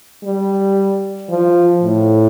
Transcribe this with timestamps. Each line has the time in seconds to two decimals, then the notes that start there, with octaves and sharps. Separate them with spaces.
0.24 G3
1.30 F3
1.83 A2